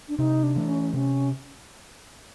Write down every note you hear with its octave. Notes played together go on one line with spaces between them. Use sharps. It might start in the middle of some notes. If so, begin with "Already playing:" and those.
D4
C3 D#4
D4
E3 A3
C#4
C3 C#4